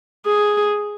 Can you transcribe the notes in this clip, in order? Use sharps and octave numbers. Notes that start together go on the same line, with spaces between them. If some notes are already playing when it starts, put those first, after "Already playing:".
G#4